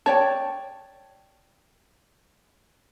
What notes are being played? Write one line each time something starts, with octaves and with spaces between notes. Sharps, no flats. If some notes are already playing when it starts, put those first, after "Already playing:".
C#5 D5 G5 A5